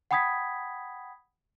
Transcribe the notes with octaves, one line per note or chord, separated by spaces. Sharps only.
F#5 G5 B5 D#6 G#6 B6